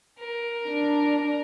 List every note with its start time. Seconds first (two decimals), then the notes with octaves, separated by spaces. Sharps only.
0.19 A#4
0.68 D4